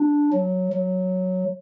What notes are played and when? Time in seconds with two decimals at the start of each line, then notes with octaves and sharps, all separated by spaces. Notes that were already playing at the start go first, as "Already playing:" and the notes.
Already playing: D4
0.33 F#3
0.73 F#3